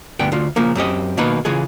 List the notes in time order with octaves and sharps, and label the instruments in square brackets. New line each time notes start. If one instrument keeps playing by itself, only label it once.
[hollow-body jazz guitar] D2 G2 B3 G5
D2 F4
A#2 C#3 F3 A#3
F#2 C4 G4 D#5
B2 D#3 A#3 B4
C#3 E3 F4 G#4